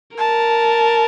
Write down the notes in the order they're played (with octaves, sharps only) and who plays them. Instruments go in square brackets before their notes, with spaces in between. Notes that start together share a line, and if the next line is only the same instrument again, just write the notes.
[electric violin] A#4 [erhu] A5